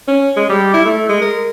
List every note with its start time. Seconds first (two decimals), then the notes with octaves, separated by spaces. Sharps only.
0.08 C#4
0.37 G#3
0.49 G3
0.74 E4
0.85 A3
1.09 G#3
1.22 A#4